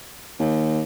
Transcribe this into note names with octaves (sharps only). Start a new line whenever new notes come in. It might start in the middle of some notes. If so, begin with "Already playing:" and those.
D#2